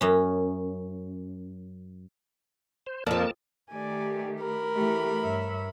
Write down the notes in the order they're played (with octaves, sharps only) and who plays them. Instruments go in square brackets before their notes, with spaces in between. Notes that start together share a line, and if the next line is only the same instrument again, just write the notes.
[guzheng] F#2 C#4
[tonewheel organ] C5
[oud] F2 F3 [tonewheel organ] A#3 A#4 A5
[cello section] D#3 A3 G4 [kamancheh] D5 G#5
[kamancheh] A#4 B5
[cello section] E3 A3 G4
G2 C#5 E5